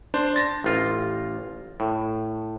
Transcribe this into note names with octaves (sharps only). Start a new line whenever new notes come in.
D4 C5
A6 A#6
A1 F4
A2